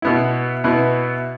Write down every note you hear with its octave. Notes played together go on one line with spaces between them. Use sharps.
B2 B3 E4
B2 B3 E4